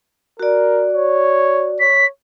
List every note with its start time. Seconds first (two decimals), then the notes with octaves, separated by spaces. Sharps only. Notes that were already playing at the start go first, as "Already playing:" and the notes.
0.40 F#4 A#4 D5
0.93 C#5
1.80 C#5 B6